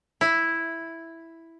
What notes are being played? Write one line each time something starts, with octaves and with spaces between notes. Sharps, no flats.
E4